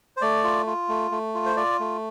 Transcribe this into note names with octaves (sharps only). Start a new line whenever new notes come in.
C5
A3 D5
F4
F4
A3
A3
F4
C5
F4 D5
A3